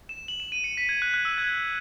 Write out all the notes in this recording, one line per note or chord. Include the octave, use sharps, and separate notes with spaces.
E7
F#7
E7
D#7
C#7
B6
G#6
F#6
F#6
E6
G#6